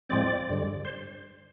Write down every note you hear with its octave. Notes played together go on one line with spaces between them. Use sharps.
A2 F3 G#3 C4 D5
G2 D3 G3
C5